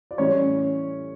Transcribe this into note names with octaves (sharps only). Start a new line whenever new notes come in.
D5
A2 E3 G3 C#4 C#5